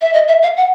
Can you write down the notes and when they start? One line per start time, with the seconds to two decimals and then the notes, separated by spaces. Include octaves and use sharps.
0.01 E5
0.14 D#5
0.28 E5
0.42 F5
0.57 F#5